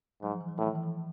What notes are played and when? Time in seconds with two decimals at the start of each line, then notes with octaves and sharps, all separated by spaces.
0.22 G#2 F#3
0.32 F3
0.41 E3
0.49 F#3
0.58 A2 E3
0.66 D#3
0.75 E3
0.83 F3